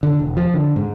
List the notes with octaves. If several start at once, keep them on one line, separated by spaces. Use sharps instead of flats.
D3
E1
F3
D3
G#2